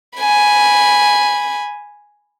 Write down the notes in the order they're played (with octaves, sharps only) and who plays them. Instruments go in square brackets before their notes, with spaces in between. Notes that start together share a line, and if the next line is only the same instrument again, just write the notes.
[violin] G#5 B5